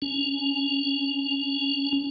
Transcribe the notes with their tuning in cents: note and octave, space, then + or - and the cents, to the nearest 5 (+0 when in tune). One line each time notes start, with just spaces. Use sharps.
C#4 +20